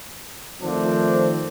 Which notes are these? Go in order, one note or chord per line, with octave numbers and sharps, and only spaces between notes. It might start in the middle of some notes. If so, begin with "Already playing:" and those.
D#3 F3 A3 C4 D4